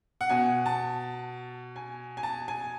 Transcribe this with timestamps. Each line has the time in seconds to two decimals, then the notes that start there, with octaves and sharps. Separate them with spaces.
0.21 F#5
0.29 B2 G#5
0.66 A5
1.76 G#5
2.17 G#5
2.23 A5
2.48 G#5